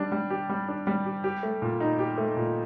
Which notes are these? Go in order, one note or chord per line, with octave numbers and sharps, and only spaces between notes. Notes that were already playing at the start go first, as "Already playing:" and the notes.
Already playing: G3 D4
G3
G4
G3
D4
G3
G4
G4
A3
A#2
D#4
G4
A3
A#2